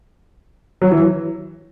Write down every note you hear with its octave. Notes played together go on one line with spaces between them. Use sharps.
F#3
E3